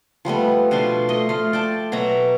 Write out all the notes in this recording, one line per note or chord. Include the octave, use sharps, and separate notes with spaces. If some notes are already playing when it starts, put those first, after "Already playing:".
F3 G3 A3 B3
B2 F3 D4 C6
A3 D#5 C6
A3 F4
D5 G5 A5
B2 F#3 E5 A#5